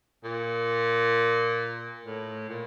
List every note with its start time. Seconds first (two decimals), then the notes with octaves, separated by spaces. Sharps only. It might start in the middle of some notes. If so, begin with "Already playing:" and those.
0.24 A#2
2.05 A2
2.49 A#2